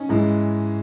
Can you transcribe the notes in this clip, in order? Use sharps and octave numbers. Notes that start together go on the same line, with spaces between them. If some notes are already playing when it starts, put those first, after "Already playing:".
Already playing: C#4 D#4
G#2 E3 G#3